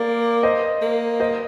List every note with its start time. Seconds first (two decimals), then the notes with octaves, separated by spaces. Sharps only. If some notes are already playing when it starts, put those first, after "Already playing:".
Already playing: A#3 D5
0.43 C5 D#5
0.82 A#3
1.20 C5 D#5